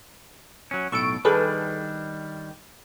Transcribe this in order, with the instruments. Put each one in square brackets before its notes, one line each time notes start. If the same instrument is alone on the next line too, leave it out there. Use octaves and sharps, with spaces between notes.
[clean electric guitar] F#3 C#4
[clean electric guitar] B1 A2 A4 [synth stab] C#6 D7
[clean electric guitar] D#3 G3 D4 [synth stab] G#4 A4 B4